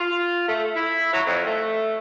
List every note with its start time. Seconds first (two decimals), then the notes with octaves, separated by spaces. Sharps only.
0.01 F4
0.48 A3
0.76 E4
1.13 F#3
1.27 F2
1.47 A3